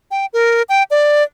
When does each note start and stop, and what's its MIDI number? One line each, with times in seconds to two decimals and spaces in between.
0.11 0.26 79
0.33 0.62 70
0.69 0.83 79
0.91 1.23 74